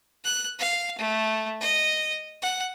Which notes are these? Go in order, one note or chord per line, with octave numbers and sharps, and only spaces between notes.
F#6
F5
A3
D#5
F#5